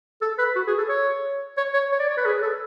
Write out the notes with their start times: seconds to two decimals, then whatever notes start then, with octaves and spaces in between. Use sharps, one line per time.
0.22 A4
0.38 B4
0.56 F#4
0.67 G#4
0.78 A4
0.89 C#5
1.57 C#5
1.74 C#5
1.92 C#5
1.99 D5
2.08 C#5
2.18 B4
2.26 G#4
2.42 A4